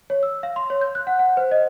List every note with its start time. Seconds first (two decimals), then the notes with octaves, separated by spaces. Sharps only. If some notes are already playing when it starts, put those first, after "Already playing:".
0.10 C#5
0.23 E6
0.43 F5
0.56 C6
0.70 C#5
0.81 G6
0.95 F#6
1.07 F#5
1.19 F#5
1.37 C5
1.51 D#5